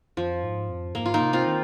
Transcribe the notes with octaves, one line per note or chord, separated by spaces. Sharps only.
F2 F3
G#2
F2
G#2 A#3
F4
A#3 D#4
C3
C4 F4
D#3